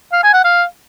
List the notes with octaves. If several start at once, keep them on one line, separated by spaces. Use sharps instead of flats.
F5
G#5
F#5
F5